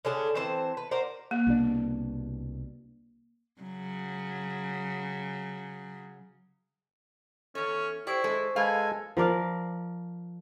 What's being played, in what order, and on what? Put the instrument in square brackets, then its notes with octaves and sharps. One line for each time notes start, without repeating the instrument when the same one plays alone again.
[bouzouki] D3 C#4 D4 G#4
E3 C4 C5 A5
B4
F#4 A#4 C5 D5
[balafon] A#3
[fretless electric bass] C2 B2 D4
[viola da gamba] C#3 F#3
[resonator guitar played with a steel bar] E2 C#5 [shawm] C#4 [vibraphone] A4
[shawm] E4 [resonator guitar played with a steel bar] G4 D5 [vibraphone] C5 C#6
[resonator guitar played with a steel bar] G#3 A4
[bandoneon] G#3 A4 [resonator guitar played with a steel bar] B4 F5 [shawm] G#5
[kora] F3 A#4 D5 F5